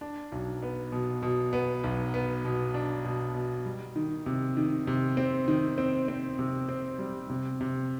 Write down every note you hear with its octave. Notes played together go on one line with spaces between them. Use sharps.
D4
B1
B3
B2
B2
B3
B1
B3
B2
D4
B2
B2
G3
D#3
C3
D#3
C3
C4
D#3
C4
C4
C3
C4
G3
C3
C3